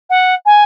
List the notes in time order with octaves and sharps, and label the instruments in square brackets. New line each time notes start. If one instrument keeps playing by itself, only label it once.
[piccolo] F#5
G#5